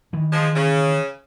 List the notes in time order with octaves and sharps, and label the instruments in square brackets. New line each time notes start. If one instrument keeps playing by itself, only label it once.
[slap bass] D#3 E3
[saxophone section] F3 G#3
C#3